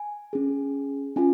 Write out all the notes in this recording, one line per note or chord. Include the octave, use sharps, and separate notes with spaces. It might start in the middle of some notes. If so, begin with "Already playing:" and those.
Already playing: G#5
C#4 G#4
C#4 F4 G#5